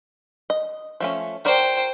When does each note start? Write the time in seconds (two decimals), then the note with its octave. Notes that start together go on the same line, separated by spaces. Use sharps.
0.50 D#5
1.00 F3 A3 C#4
1.45 F#4 A#4 C5 D5 G5